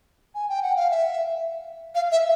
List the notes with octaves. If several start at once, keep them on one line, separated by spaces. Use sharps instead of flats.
G#5
G5
F#5
F5
E5
F5
E5